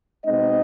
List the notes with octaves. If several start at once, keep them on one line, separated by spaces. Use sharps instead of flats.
B2 G#3 C4 D#4 D#5